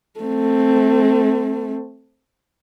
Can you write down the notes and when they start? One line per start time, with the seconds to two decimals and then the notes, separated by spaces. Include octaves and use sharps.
0.20 A3 C4